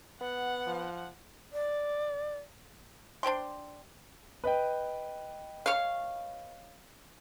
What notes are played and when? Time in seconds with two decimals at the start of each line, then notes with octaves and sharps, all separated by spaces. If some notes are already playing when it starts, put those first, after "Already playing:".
0.21 B3 F#5
0.67 F3
1.53 D5
3.23 D4 C5 G5 C6
4.44 B4 D#5 G5
5.66 C#5 F5